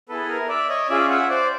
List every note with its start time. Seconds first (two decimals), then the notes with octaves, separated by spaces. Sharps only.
0.09 B3 E4 G#4 A4 B4
0.29 A#4
0.49 D5 E5
0.69 C#5 D#5
0.89 C#4 F4 G#4 D5 E5
1.09 E5 F#5
1.29 C5 D5